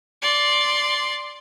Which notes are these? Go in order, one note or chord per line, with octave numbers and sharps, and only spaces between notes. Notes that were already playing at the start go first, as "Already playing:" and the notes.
D5 C6